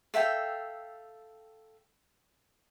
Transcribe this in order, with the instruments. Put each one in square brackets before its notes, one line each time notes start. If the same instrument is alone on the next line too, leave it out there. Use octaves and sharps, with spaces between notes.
[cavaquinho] A4 E5 F5 G5